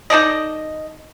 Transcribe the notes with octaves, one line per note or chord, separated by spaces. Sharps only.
D#4 A4 D5 D#5